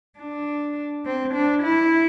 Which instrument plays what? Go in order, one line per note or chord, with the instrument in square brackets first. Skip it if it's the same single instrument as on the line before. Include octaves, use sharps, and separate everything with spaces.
[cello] D4
C4
D4
E4